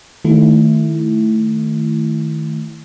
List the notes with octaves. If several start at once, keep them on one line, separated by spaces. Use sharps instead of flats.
D#3 A3 E4